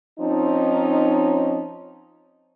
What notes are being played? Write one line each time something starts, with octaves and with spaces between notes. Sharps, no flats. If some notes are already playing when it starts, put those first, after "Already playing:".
F3 C4 C#4 D#4